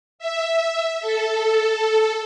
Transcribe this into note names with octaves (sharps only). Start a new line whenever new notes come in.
E5
A4